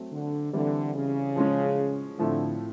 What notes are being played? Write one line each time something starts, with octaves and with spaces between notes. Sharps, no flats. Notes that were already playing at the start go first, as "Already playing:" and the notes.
Already playing: F#3 A3 C4
D3
D3 E3 G3 C4 E4
C#3
F3 G#3 C#4
A2 D3 F3 A3 C4 E4